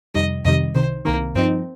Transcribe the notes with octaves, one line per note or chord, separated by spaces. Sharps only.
F2 C3 D#3 G3 D#5
F2 C3 D#3 G3 D#5
C2 C3 D#3 C5
C2 C3 D#3 A#3
G2 F3 C4 D#4